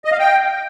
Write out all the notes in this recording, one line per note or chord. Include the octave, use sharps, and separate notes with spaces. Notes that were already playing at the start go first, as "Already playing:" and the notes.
D#5
F5
G5